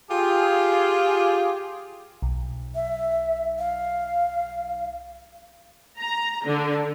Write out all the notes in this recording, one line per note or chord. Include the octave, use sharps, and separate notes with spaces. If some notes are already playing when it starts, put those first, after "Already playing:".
F4 G4 G#4
B1
E5
F5
A#5
D3